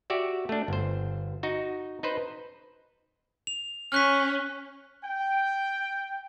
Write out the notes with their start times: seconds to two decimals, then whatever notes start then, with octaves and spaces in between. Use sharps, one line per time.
0.10 F#4 G4 D5 E5
0.49 A3 D4
0.68 G1 C5
1.43 D#4 F#4
2.03 D#4 B4 C5
3.47 F7
3.92 C#4 F6 F#6 B6
5.04 G5